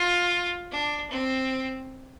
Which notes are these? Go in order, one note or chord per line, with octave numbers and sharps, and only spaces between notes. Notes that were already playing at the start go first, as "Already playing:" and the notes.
Already playing: F4
D4
C4